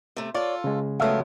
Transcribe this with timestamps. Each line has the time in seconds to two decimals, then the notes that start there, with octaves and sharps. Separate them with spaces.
0.17 C3 A3
0.34 F4 A4 C#5 D5
0.64 C#3 G#3
1.00 F3 F#3 A3 B3 E5 F5